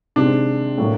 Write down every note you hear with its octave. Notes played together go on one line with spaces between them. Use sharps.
C3 D#3 G#3 C4 D4
A2 F#3 A#3